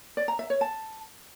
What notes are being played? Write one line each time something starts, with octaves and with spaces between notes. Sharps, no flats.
D5
A#5
E5
C#5
A5